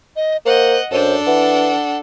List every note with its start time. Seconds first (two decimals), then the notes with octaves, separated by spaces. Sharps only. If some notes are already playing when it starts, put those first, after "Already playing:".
0.16 D#5
0.46 A#3 C5 D#5 F#5
0.92 F#2 D4 A4 C5
1.27 E3 F#5